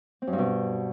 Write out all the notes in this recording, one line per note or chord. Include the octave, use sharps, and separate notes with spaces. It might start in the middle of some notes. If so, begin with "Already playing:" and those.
C4
F#2
G2
B2